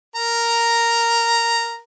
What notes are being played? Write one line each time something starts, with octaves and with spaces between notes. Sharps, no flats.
A#4 A#5